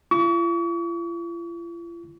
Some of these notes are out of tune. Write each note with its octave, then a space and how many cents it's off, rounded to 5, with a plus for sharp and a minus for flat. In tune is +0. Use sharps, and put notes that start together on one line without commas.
F4 -45 C#6 +40